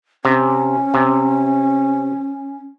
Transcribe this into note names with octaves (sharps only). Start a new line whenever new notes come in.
C3 C#4
C3